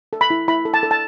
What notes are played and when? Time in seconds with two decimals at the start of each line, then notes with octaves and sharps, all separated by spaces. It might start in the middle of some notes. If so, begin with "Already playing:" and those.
0.13 A4
0.21 B5
0.30 E4
0.48 E4 B5
0.65 A4
0.74 A5
0.83 A4
0.91 A5